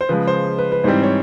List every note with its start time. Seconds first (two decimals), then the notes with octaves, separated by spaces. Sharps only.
0.01 C5
0.09 C#3 F3 G#3 B4
0.27 C5
0.59 B4
0.72 B4
0.84 G#2 E3 G3 C4 C5
1.03 C#5